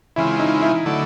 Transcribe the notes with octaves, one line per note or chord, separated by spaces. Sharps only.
C#3 E3 G#3 C4 E4 F4
D#4
E4
D3 F#3 A3